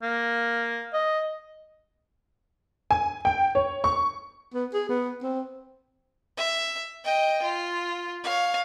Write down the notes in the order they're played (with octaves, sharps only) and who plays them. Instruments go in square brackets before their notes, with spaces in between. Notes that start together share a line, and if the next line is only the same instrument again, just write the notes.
[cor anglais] A#3
D#5
[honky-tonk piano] G#5
G5
C#5
C#6
[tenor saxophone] B3
G#4
B3
C4
[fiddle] E5
D#5 G5
F4
C#5 F5